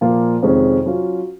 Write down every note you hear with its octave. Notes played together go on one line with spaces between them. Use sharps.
A#2 F3 A#3 F4
F2 C3 D#3 G#3 C#4
F#3 C#4 F4